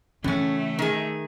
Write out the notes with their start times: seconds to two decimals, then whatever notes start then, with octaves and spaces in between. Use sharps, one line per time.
0.24 A2 C#3 E3 A3 C#4
0.79 D#3 G#4